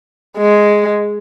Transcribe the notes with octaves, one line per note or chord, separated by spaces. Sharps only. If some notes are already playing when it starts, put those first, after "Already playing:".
G#3